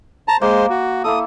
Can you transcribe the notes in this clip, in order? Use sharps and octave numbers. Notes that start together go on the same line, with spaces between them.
C5 A5 A#5
G#3 A#3 C5
F#4
A#3 E4 A4 D#6